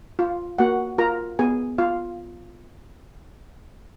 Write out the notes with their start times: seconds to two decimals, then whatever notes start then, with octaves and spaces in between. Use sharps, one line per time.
0.19 F4
0.59 A#3 F#4 F#5
0.98 F4 A#4 A#5
1.39 B3 G#4 G#5
1.78 F4 F5